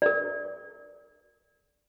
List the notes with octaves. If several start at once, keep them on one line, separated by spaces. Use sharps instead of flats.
A#4 D5